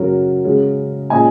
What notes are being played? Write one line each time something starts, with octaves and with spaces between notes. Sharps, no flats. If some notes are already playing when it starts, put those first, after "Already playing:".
Already playing: F#2 C#3 F#3 C#4 F#4 A#4
C#3 G#3 C#4
A#2 G#3 C#4 D#5 G#5